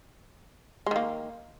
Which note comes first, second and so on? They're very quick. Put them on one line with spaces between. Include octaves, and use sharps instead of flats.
G#3 D#3 A#3